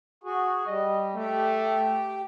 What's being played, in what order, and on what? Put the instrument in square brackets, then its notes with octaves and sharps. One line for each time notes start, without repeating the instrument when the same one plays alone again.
[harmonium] F#4 G#4
[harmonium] G3 [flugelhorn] D#5
[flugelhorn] A3 [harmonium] G4